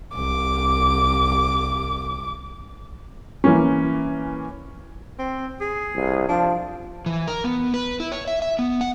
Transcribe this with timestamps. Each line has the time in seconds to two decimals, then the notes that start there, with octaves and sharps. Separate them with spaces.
0.15 C2 D6
3.44 E3 A#3 C#4
5.19 C4
5.61 G#4
5.95 C2
6.29 F3 D4
7.06 E3
7.27 A#4
7.44 B3
7.74 B4
8.00 E4
8.12 C#5
8.28 E5
8.42 E5
8.59 B3
8.81 F#5